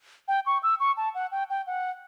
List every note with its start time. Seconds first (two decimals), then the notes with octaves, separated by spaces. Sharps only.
0.28 G5
0.46 C#6
0.63 E6
0.80 C#6
0.97 A5
1.15 F#5
1.32 G5
1.50 G5
1.67 F#5